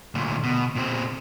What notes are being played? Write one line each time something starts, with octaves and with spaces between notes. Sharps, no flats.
D2 A#2
B2
A#2 C4